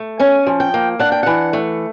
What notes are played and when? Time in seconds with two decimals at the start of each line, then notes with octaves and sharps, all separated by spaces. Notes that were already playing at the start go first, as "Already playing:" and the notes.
Already playing: A3
0.19 C#4 G#5
0.47 F3
0.60 G5
0.74 A#3
0.99 D4 F#5
1.12 G5
1.23 E3 F#5
1.53 A3